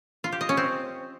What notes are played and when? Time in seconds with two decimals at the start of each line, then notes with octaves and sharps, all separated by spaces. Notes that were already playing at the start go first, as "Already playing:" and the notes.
0.24 F4
0.32 G4
0.41 D#5
0.49 C#4
0.57 C4